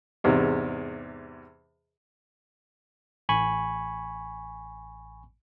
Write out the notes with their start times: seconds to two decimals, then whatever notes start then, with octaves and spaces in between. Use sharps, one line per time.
0.24 E2 G#2 C3
3.29 A1 G#5 B5 C#6